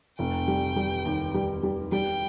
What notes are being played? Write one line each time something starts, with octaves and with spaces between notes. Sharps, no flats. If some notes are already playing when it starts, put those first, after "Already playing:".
F1 G5
G3
G3
D#2
G3
G3
G3 G5